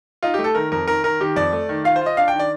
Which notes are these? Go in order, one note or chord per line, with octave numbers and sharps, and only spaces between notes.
D#4 F4
G4
A3
A4
D#3 A#4
F2 A#4
D#3 A#4
D#3 A#4
D#3 G4
F2 D5
A3
D#3
F4 F5
C5
F4 D#5
D4 F5
G5
D#3
D5